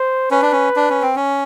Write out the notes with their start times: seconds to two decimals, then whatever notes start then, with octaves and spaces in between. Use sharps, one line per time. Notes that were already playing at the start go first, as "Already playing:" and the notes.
Already playing: C5
0.31 C#4 B4
0.42 D4
0.52 C#4
0.76 D4
0.90 C#4
1.02 C4
1.16 C#4